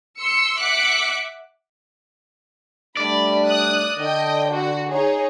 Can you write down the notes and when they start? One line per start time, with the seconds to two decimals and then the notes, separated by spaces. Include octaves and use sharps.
0.19 C6 E6 C#7
0.60 E5 F#5 D6 F#6 B6 C#7
2.97 G3 A3 D4 D5 B5
3.47 D#6 F#6
3.98 D3 D#5 G5
4.51 F#4
4.91 D#4 G#4 C#5